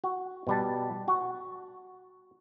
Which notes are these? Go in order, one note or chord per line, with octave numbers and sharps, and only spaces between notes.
F#4
B2 G3 A5
F#4